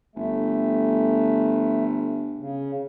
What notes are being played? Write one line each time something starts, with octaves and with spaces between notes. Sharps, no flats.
G1 A3
C#3